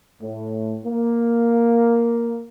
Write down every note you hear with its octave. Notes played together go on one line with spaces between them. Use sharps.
A2
A#3